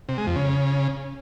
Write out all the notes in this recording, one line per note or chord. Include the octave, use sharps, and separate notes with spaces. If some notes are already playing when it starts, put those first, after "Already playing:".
C3
G#3
F2
C#3